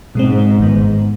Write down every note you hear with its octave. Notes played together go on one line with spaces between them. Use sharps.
G#2 B2 G#3 C4
G#1 G2 D#3 B3